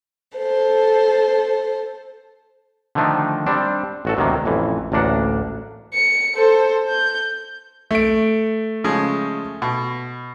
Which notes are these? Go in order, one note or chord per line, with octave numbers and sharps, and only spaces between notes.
A4 C5
D3 D#3 F3 A3 D4 D#4
G3 C4 D4
A1 F#4 A4
D2 C3 D#3 F#3 A#3
A1 F2 E3
A1 D2 A#3 D4 F#5
C#7
A4 C5
G6
A3 D7
C#3 F3 G#3
B2